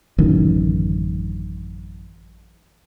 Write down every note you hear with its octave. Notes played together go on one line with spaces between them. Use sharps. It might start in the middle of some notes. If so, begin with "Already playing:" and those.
A1 F#2 D3 D#3